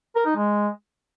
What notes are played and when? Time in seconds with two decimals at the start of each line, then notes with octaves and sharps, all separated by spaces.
0.16 A#4
0.26 D#4
0.36 G#3